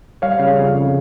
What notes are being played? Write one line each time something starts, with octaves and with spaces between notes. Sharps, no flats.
G3 C#5 F5
C#3
F2
C#3